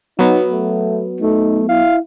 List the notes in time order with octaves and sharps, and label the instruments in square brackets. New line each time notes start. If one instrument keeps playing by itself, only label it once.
[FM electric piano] F#3 B3 [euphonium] D#4
[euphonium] A3
[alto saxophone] A3 [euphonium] D#4
[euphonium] E4 [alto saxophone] F5